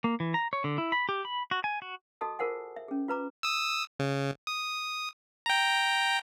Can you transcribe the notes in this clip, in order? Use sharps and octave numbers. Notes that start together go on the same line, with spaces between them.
A#3
E3
A#5
C#5
D3
E4
B5
G4
B5
F#4
G#5
F#4
F#4 A4 D#5 A5 D#6
F4 G#4 A#4 C5 F#5 G#5
E5
C#4 G#4
F4 B4 A#5 D6
D#6 E6
C#3
D#6
G5 A#5